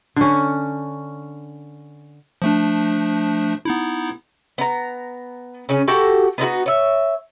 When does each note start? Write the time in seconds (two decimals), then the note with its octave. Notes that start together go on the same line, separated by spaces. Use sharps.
0.16 D3 C#4
2.42 F3 A3 D4
3.65 B3 D#4 E4
4.58 B3 A#5
5.69 C#3 C#4
5.88 F#4 G4 A4 F#5
6.38 B3 D#4 E4 F#4
6.66 C#5 E5